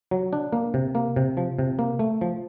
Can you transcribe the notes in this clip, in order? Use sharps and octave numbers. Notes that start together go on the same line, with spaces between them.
F#3
D4
A#3
C3
A#3
C3
F3
C3
A#3
A3
F3